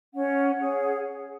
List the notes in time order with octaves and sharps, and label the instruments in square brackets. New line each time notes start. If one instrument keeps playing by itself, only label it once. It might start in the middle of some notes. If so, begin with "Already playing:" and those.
[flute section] C#4 F#5
G#4 C#5